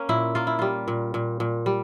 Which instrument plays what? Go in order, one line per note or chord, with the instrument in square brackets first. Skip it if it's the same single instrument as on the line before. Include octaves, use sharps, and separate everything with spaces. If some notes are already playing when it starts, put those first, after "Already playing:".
Already playing: [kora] A#3 C#4
A#2 E4
A#3 F4
E4
G3 F4
A#2
A#2
A#2
G3